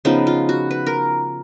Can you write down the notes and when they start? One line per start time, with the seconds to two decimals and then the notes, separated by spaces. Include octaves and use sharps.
0.05 C#3 F3 B3 D#4
0.27 F4
0.49 F#4
0.71 B4
0.87 A#4